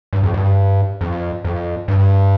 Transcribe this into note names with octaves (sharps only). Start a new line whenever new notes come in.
G2
F2
G2
F2
F2
G2